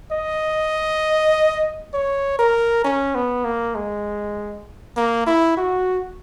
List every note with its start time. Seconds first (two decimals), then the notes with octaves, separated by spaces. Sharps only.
0.12 D#5
1.94 C#5
2.39 A#4
2.84 C#4
3.15 B3
3.45 A#3
3.75 G#3
4.97 A#3
5.26 E4
5.57 F#4